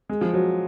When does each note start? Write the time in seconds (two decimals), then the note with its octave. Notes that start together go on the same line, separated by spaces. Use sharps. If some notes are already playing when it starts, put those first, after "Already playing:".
0.09 G#3
0.21 F3
0.34 F#3